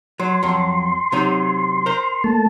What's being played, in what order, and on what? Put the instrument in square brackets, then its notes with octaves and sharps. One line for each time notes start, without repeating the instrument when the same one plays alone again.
[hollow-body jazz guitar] F#3 [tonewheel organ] C6
[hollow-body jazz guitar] F2 F#3
C3 F#3 D#4
A#4 C5
[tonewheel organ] A3 A#3 A5